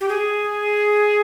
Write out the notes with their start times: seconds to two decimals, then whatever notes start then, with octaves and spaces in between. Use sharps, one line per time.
0.01 G4
0.09 G#4